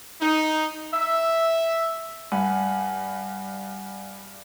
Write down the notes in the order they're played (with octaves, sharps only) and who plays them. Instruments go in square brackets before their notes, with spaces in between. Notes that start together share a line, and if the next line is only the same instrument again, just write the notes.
[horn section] D#4
E5
[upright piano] G2 [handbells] F#5 G#5 B5